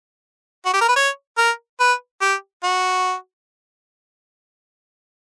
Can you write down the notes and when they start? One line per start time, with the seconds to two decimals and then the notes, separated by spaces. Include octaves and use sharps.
0.66 F#4
0.73 G4
0.81 A#4
0.88 B4
0.96 C#5
1.38 A#4
1.80 B4
2.21 G4
2.63 F#4